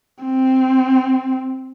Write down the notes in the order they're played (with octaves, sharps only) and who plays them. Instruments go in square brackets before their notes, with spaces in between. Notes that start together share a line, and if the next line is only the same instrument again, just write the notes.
[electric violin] C4